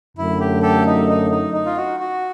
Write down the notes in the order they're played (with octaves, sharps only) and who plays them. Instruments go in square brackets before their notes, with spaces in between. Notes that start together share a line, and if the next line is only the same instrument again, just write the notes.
[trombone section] F#2 D3 F#3 A3 [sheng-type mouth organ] E4
[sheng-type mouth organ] G4
G4 A4
D#4
D#4
D#4
D#4
F4
F#4
F#4